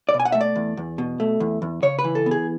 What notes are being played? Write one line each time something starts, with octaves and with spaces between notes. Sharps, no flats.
D5
B2
G#5
F#5
A3 E5
D5
E2
E2
B2
A3
E2
E2
C#3 C#5
B4
E3
A4
B3
G#4